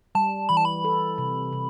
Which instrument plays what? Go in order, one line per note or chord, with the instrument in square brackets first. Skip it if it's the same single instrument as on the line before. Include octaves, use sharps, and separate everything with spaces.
[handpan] G3 [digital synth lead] A5
[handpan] E3 [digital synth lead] B5
[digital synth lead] A5
B5
[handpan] A4
C3
C3